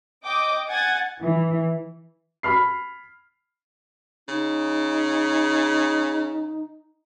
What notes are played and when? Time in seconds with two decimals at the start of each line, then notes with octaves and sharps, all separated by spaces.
0.23 D#5 G5 D6
0.67 F#5 G#5 G#6 A6
1.20 E3
2.43 B5 F6 C7
4.28 C#3 D#4